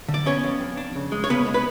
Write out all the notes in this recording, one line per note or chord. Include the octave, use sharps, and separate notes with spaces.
D3
D5
B3 C#4 C#5
F2
F2
D4
C#3
G#3
C#5
C#3 B3 B4
G#3
B4